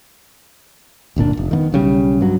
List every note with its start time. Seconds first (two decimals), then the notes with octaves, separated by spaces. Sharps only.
1.16 D1 G1 A#2 D4
1.37 F1
1.51 D#3 A#3 B3
1.72 B1 C#3 G3
2.21 G2 F#3